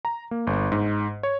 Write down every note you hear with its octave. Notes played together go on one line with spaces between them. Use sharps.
A#5
A#3
G1
G#2
C#5